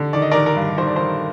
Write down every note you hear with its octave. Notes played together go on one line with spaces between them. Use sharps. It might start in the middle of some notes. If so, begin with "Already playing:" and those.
Already playing: D3
D#3 D5
D#5
D#3 A#4 D5
A#4
G2
D#3 C5
D5
D#3 C5